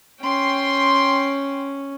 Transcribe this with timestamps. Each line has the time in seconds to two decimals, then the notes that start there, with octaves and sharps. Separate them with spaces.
0.22 C#4 G5 C6